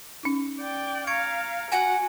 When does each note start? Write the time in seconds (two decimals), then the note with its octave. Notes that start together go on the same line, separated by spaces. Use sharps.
0.23 C#4 D#4
0.59 D5 G5
1.07 F5 A#5 C#6 G#6 C#7 D7
1.72 F#4 F#5 G#5